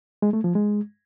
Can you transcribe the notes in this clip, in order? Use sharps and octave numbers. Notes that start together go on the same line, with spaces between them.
G#3
A3
F3
G#3